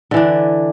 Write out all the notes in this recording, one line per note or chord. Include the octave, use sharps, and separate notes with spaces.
D3 E3 D4